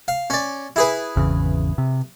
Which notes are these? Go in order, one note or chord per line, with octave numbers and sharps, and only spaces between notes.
F5
C#4 D5
E4 G#4 B4
G#1 E2 C#3
C3